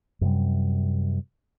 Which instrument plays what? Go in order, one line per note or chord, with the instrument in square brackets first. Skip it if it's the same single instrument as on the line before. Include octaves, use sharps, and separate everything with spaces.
[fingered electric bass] F#2 C3 G3